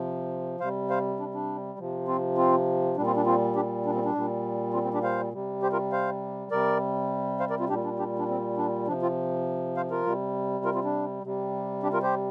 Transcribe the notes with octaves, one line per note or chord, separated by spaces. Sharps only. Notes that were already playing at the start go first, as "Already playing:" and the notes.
Already playing: C3 F3
C3 G3 C5 F5
C5 F5
D4
D4
C3 F3
C4 F4
C4 F4
A#2 G3 D4
C4 F4
D4
C4 F4
D4 G4
D4
C4
D4
A#2 G3
C4 F4
C4
D4 G4
C5 F5
C3 G3
G4 C5
F4 A#4
C5 F5
C3 G3 A#4 D5
C5 F5
A#4 D5
C4 F4
A#2 G3 D4 G4
D4
D4 G4
D4
C4
D4
C3 F3 D4
C4 F4
C5 F5
F4 A#4
C3 G3
F4 A#4
C4 F4
D4
C3 G3
D4 G4
F4 A#4
G4 C5